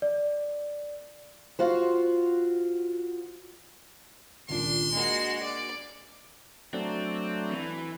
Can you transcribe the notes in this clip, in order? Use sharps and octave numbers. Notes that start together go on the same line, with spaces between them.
D5
F4 F#4 C5
D#1 C#2 A#2 D4 C6
G#3 A#3 D4 F#4 A#4
D5
F#3 A3 C4 D4
E3